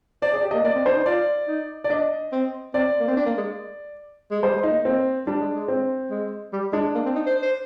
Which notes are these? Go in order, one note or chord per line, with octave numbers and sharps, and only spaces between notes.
C5 D5
G#4
D5
G4
A#3 D#5
A#3 D5
C4
D4 C5
D#4
F4 D5
D#4
D5
D4 D#5
C4
C4 D5
A#3
C4
D4
A#3
G#3
G#3
G3 C5
G#3
D#4
A#3
A#3 C4
G3 D4
G#3
G#3
C4
G#3
G3
G#3 D4
A#3
C4
D#4
C5
C5